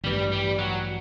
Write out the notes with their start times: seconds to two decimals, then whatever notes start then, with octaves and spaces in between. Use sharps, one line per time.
0.04 A1 G2 E3 G3
0.32 G3
0.59 F#3